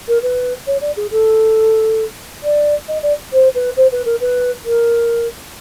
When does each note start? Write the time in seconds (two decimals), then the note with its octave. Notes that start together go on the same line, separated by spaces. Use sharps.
0.08 A#4
0.22 B4
0.67 C#5
0.81 D5
0.97 G#4
1.11 A4
2.44 D5
2.88 D#5
3.03 D5
3.33 C5
3.55 B4
3.77 C5
3.92 B4
4.06 A#4
4.21 B4
4.65 A#4